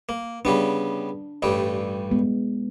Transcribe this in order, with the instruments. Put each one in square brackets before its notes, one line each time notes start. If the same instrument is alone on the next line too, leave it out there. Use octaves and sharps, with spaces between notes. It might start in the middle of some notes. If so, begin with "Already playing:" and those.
[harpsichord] A#3
[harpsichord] C#3 G3 B3 [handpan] D4
[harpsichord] A1 G2 G3
[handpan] G#3 B3